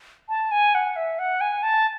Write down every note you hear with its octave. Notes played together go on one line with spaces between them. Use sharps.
A5
G#5
F#5
E5
F#5
G#5
A5